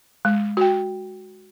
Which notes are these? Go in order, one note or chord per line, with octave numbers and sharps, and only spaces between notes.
G#3
F#4 G5